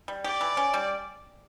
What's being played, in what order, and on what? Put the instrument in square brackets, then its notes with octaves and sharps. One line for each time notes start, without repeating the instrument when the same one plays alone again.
[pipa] G3
[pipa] G4 [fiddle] D5
[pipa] E3
C#4
G3